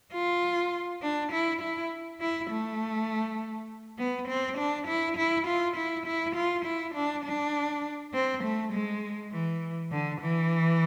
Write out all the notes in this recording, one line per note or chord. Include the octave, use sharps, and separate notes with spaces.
F4
D4
E4
E4
E4
A3
B3
C4
D4
E4
E4
F4
E4
E4
F4
E4
D4
D4
C4
A3
G#3
E3
D3
E3